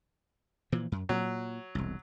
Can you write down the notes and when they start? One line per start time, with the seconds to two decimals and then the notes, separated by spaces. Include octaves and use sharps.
0.72 A#2 E3 F3
0.92 F#2
1.09 A#2 F#3
1.75 E1 C2